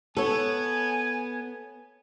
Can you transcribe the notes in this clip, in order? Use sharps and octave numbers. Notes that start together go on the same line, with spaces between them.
B3 A4 C#5 G#5